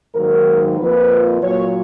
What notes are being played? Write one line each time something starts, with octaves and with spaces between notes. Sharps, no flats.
G#2 D#3 F#3 A#3 A#4
F2 F3 A#3 B4
A#2 F#3 A#3 C#5